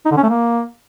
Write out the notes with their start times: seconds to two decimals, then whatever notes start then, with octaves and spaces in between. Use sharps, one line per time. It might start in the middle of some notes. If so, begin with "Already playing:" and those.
0.05 D#4
0.11 D3
0.17 C#4
0.23 A3
0.29 A#3